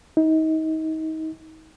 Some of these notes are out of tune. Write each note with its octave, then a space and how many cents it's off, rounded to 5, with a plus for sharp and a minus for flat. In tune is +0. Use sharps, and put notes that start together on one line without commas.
D#4 +30